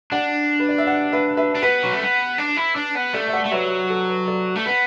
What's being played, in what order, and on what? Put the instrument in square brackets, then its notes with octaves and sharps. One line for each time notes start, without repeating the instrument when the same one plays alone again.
[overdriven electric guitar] D4 [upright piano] D5 F#5
[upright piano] B4
D5
E5
D5 F#5
B4 E5
B4 E5
[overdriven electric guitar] D4
[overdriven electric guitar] B3 [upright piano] B4
[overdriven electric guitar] F#3
A3
B3
D4
E4
D4
B3
[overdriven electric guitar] A3 [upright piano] A4 D5
[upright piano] E5
D5 F#5
[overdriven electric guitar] A3
[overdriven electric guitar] F#3 [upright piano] B4 E5
[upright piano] A4
B4
A4 D5
[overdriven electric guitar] A3
[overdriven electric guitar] B3 [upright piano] B4